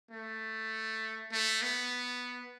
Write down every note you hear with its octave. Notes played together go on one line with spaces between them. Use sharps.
A3
A3
B3